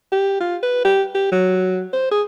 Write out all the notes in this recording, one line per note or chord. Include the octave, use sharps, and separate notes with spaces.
G4
F4
B4
G4
G4
F#3
C5
G#4